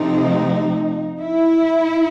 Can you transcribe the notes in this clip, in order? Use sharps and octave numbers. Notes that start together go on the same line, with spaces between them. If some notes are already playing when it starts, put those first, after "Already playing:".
Already playing: C3 F3 A3 C4 D#4
E4